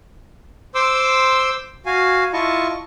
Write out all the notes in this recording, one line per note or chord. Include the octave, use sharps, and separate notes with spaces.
C5 C6 D6 E6
F#4 F5 G#5
E4 F4 D#5 A5 C#6